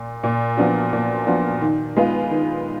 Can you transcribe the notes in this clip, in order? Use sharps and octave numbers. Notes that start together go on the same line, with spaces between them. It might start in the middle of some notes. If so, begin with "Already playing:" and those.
Already playing: A#2
A#2
F3 B3 D4 F#4
A#2
F3 B3 D4 F#4
D#3
G#3 B3 F4 B4
D#3